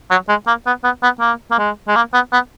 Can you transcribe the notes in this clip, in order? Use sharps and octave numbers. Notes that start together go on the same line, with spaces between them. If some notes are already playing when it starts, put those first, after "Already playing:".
F#3
G#3
A#3
B3
B3
B3
A#3
A#3
G#3
G#3
A#3
B3
B3